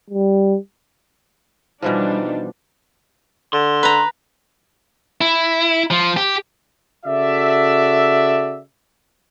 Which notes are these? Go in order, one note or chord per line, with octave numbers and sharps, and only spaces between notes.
G3
B2 E3 F3 G3 D4 D#4
D3 C6
B4 A#5
E4
F3
G4
C#3 F#4 A4 D5 E5